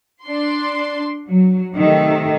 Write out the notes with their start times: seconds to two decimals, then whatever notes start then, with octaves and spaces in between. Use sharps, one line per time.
0.25 D4 C6
1.28 F#3
1.74 C3 D#3 A3